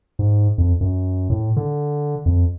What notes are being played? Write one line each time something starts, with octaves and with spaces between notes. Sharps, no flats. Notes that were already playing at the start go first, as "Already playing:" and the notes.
G#2
F2
F#2
A2
D3
F2